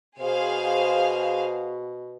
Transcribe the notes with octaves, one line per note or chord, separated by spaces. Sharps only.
B2 G#4 C5 F5